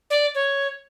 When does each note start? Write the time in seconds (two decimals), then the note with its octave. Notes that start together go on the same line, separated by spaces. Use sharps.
0.10 D5
0.35 C#5